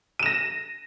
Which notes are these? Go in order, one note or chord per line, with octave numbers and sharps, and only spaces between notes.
A#6 D#7 E7